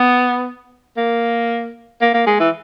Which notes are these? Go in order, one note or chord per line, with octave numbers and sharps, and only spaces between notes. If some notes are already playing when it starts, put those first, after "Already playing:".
Already playing: B3
A#3
A#3
A#3
G#3
E3